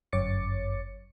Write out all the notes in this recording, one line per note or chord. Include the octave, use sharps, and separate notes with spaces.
G1 F#2 C#5 D6 A6 C#7